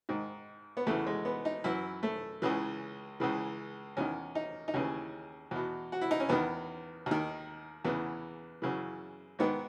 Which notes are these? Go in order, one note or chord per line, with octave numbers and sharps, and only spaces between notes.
G#2 D#3
B3
E2 C#3 E3 A3
G#3
B3
D#4
F#2 E3 E4
A3
C#2 C#3 E3
C#2 C#3 E3
E2 D#3 C#4
D#4
D#4
D#2 C#3 E3 C#4
E2 B2
F#4
E4
D#4
C#4
E2 D#3 B3
D#2 D#3
E2 C#3 E3 B3
F#2 C#3 E3
G#2 D#3 B3